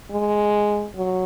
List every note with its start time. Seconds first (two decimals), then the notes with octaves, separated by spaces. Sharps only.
0.12 G#3
0.96 F#3